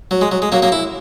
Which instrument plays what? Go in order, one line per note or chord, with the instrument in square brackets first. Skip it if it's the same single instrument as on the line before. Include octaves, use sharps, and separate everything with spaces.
[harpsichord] F#3
G#3
F#3
G#3
F#3 A#3
F#3 A#3
E4